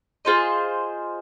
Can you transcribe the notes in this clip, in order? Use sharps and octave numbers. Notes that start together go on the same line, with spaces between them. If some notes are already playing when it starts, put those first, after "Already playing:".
F4 G#4 C5 D#5